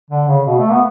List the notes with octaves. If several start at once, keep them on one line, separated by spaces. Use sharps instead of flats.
D3
C#3
B2
A3
B3